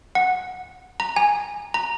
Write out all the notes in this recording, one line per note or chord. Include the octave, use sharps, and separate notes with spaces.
F#5
A#5
G#5
A#5